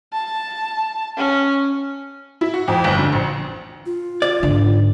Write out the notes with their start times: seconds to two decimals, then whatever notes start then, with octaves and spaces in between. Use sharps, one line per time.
0.13 A5
1.18 C#4
2.41 E4
2.54 F#4
2.68 F2
2.84 G1
2.99 D3
3.12 A#1
3.86 F4
4.22 D5
4.43 G#2 D3